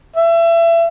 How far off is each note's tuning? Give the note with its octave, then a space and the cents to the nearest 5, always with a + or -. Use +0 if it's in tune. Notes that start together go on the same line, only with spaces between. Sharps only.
E5 +30